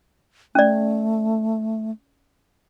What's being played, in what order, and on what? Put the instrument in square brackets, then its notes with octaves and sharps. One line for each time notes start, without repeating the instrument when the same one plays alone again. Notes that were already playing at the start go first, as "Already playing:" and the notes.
[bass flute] A3 [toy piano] C#4 D5